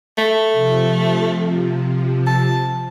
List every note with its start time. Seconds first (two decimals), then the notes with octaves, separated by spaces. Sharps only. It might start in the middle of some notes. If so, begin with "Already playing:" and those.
0.18 A3
0.52 C3 F3
2.27 A5